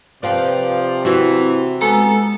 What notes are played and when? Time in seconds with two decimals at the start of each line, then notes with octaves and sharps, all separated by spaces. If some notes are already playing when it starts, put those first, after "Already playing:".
0.23 C3 F3 B4 D5 F5 G5
1.05 E3 C4 F#4
1.81 G#3 B3 A4 A#5